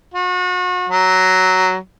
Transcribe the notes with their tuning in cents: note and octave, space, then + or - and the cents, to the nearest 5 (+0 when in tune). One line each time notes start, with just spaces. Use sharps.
F#4 -35
F#3 +10